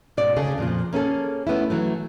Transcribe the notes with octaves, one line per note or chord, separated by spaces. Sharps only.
G#2 B2 D5
D2 C#3 G#4 A4
F2 A#2 F3
A#3 C#4 G#4 A4
A3 B3 C#4 E4
E3 F#3 A3